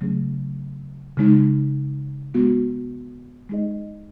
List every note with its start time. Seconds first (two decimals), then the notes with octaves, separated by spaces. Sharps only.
0.01 C#3 F#3 A3 C#4 G#4
1.17 C#3 G#3 D#4
2.34 G#3 B3 F#4
3.49 G#3 D#4 G#4 D#5